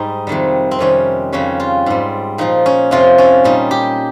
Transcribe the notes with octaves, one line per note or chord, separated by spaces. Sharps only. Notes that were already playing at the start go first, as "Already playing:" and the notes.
Already playing: G#2 G3 D#4 C5
F2 C3 D#3 G3
C4
F2 C3 D#3 G3 C#4
F2 C#3 G3 C#4
F4
G#2 G3
A#2 F3 D#4
C#4
F2 C3 F3 F4
C#4
A#2 G3 D#4
G4